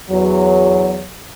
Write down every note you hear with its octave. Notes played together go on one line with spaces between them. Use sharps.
E2 F#3